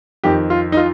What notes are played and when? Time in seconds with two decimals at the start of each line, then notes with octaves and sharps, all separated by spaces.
0.24 F2 D#3 G4
0.50 F4
0.72 D#4
0.77 F4